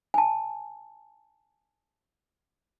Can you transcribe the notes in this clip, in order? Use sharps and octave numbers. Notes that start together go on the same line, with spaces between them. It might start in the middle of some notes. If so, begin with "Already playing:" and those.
G#5 A5